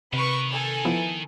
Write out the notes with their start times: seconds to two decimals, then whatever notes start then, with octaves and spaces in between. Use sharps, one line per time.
0.13 C3 D#3 A#4 B4 C#6
0.50 A4 G#5
0.85 F3 B3 E4